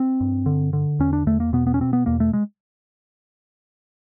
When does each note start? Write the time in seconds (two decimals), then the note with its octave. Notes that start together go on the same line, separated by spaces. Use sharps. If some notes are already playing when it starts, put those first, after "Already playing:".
Already playing: C4
0.21 G2
0.46 D3
0.73 D3
0.99 E2 C#4
1.13 D4
1.27 E2 A3
1.40 A#3
1.53 B2 B3
1.67 B3
1.74 C#4
1.80 B2 C4
1.93 B3
2.06 E2 A#3
2.20 A3
2.33 G#3